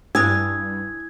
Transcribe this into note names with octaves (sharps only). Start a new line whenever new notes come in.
G2 E4 G#5 D#6 E6 G#6